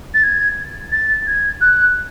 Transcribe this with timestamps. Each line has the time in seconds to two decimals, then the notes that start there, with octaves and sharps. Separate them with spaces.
0.14 A6
0.23 G#6
0.92 A6
1.27 G#6
1.61 F#6